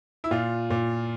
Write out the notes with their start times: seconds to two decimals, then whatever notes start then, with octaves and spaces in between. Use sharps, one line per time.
0.24 E4
0.31 A#2 F4
0.70 A#2